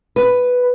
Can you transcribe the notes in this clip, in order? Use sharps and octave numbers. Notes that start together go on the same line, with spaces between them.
B4